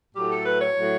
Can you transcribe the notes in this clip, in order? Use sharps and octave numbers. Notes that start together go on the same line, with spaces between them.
A2 F#3 A3 G4
A4
B4
C#5
A2 F#3 A3